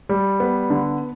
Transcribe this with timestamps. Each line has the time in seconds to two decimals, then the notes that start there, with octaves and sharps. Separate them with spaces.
0.09 G3
0.40 B3
0.70 D3